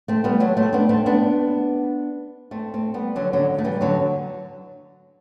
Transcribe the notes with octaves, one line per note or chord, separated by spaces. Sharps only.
A3 C4
G3 B3
F#3 A3
A3 C4
B3 D4
A3 C4
B3 D4
A3 C4
A3 C4
G3 B3
D3 F#3
D3 F#3
A3
E3 G3
D3 F#3